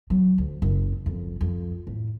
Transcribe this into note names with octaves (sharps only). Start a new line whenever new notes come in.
F#3
D2
F#1
F2
F2
A2